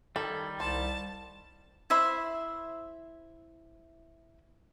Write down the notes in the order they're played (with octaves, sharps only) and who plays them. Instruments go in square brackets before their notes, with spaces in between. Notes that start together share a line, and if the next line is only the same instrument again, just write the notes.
[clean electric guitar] D#3 G3 [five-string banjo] A4
[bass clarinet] C2 [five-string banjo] C5 [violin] A5
[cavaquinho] E4 C5 E5 B5